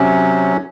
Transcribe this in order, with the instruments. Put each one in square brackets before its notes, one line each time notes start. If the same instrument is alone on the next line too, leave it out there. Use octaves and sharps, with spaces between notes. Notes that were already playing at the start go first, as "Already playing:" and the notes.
Already playing: [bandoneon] C3 F#3 C#4